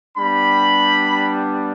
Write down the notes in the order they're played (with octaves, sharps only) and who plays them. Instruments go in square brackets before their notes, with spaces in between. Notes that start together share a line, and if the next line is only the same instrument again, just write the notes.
[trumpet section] G3 B3 D4 G4 B5